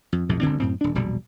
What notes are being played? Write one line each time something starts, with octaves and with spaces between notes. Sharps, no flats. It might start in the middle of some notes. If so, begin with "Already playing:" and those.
F2
B1 F2 A2 C3
G1 D2 D3 C4
F#2 A2 C4
D#1 D4
E1 A#1 B2 G3